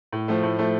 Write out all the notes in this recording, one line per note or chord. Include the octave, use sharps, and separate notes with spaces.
A2
F3 A3
A2
F3 A3